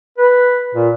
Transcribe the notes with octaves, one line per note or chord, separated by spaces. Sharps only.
B4
A#2